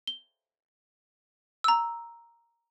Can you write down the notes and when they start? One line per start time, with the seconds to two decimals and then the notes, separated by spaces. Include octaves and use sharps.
0.07 G7
1.64 A#5 E6